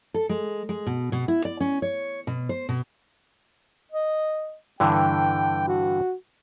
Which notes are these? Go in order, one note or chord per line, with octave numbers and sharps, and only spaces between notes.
A4
G#3
G#3
B2
B2
E4
D5
C#4
C#5
B2
C5
B2
D#5
G2 D3 E3 G5
F#4